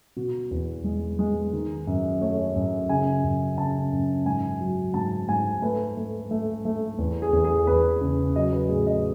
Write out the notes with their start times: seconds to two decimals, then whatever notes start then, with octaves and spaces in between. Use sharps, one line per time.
0.17 B2 F#4
0.51 E2
0.84 G#3
1.19 G#3
1.53 D#3
1.87 F#2
2.21 A3 C#5
2.56 F#2
2.89 C#3 G#5
3.24 F#2
3.58 C#3 A5
3.92 F#2
4.26 G#2 G#5
4.61 F#3
4.94 G#2 A5
5.29 G#2 G#5
5.62 A3 B4
5.97 A3
6.31 A3
6.65 A3
6.98 E2
7.22 G#4
7.33 E2
7.44 G#4
7.67 E2 B4
8.01 C#3
8.36 F#3 D#5
8.53 B4
8.69 A2 G#4
8.87 D#5